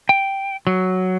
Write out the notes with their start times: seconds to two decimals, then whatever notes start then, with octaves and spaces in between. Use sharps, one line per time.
0.09 G5
0.67 F#3